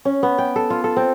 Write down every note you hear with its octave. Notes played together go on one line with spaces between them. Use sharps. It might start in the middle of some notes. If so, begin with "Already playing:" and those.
C#4
B3
G5
A4
F4
A4
C4